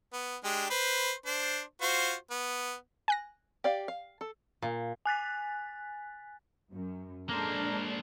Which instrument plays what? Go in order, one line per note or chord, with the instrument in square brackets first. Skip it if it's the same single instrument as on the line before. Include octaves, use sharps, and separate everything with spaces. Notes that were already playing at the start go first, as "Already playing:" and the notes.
[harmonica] B3
G#3 D4 G4
B4 C5
D4 C5
F4 F#4 C5
B3
[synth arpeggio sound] G#5 F#6 A#6
[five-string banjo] G4 D5 F5
F5
A4
[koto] A#2
[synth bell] G#5 F#6 A6 B6
[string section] F#2
[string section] G#3 D4 A4 [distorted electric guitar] A#3 C5 [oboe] A#4